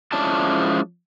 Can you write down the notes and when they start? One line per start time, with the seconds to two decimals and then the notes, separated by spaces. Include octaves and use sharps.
0.13 F3 G#3 C#4 E4 D5 A5